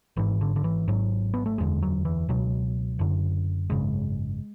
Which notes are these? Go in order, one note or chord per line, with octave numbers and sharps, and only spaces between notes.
G#1 G#2 E3
D3
D3
E3
G#1 G#2 F#3
B3
A3
F#1 E2 D3 G#3
F#3
E3
C#2 B2 F#3
F#1 F#2 D3
G#1 F#2 C#3 G#3